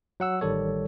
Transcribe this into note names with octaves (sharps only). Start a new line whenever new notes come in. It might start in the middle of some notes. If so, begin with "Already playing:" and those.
F#3 F#5 E6
A1 D#3 G3 A4 C#5